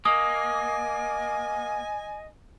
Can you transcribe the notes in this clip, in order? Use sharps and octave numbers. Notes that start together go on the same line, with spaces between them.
A#3 D#5 G#5 D#6